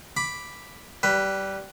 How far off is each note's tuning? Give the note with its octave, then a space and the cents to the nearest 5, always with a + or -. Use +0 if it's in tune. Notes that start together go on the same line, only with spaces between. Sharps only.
B5 +0 D6 +0
G3 -15 B4 +0